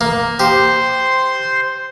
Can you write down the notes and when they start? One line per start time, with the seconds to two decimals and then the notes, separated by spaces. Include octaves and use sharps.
0.01 A#3
0.39 G4 C5 C6